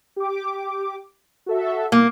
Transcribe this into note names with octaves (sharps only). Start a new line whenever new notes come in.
G4 D6
F#4 A4 E5
C2 A#3